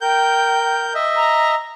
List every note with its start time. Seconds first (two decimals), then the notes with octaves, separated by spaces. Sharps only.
0.01 A#4 G5 G6
0.95 D#5 E5
1.16 A#5